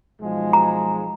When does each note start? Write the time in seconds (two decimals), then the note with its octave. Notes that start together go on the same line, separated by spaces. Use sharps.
0.21 B1 F3 G#3
0.53 A#5